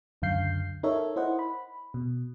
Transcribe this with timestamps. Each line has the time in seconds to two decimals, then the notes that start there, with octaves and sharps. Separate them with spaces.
0.22 C#2 F#2 D3 F5 G6 C7
0.83 D#4 A4 A#4 C#5 E5
1.16 E4 C5 D#5 F#5
1.39 B5
1.94 B2